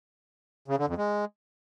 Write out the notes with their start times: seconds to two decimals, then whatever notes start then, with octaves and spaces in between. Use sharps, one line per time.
0.68 C#3
0.78 D3
0.88 F2
0.98 G#3